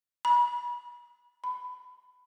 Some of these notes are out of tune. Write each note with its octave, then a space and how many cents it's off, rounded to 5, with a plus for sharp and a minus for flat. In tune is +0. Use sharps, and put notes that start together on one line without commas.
B5 -35
B5 +15